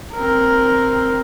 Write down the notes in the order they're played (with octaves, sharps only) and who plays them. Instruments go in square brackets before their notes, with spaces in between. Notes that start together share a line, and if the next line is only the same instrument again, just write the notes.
[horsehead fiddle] C4 A#4